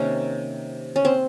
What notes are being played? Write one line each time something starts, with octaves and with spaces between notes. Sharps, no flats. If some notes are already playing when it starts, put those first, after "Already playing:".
Already playing: C3 D#3 A#3 C#4
C#4
C4